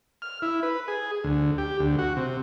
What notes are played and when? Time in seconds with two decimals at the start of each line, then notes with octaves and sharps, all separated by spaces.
0.22 F6
0.42 E4
0.63 B4
0.88 G#4
1.24 D2
1.58 G4
1.79 D2
1.98 F#4
2.17 C3